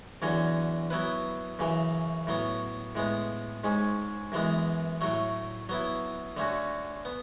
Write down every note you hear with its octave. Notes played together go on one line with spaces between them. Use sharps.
E2 D3 F#3 C#4 F#4
F#3 B3 E4 B4
F#2 C#3 E3
A2 F#3 B3
A2 G#3 B3
G#2 G#3 C#4
F#2 E3 G#3 B3
A2 F#3 A3
F#3 B3 E4
D3 A3 C#4 F#4
B3